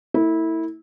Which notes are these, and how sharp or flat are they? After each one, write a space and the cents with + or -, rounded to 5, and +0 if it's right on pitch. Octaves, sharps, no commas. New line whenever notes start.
A3 +45 E4 -20